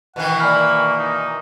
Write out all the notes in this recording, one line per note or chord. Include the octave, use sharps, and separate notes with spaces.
B2 D#3 E3 F#5
A#3 D5 G#5 B5 F6
D#4